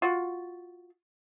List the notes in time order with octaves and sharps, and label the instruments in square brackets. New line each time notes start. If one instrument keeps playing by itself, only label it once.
[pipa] F4 F#4